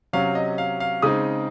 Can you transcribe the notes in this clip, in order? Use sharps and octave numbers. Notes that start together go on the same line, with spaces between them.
C3 F#3 C#4 F5
D#5
F5
F5
C#3 G#3 C4 D#4 D#6